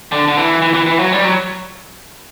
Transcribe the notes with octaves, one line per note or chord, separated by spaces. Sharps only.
D3
D3
E3
E3
E3
E3
F#3
G3
F#3